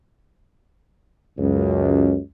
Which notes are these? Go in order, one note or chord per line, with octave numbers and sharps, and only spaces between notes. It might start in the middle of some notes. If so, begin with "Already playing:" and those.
C#2 F#2